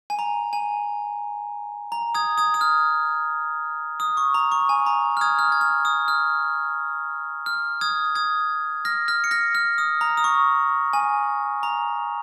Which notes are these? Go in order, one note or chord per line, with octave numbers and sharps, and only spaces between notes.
G#5
A#5
G#5
A#5
D#6 G#6
D#6 G#6
D#6
F6
D#6
C#6
A#5
C#6
G#5
A#5
F6
D#6 G#6
F6
G#6
F6
D#6
F6
F6
D#6 G#6
D#6 G#6
F6 A#6
F6 A#6
C#7
F6 A#6
F6
D#6
A#5
D#6
C#6
G#5
A#5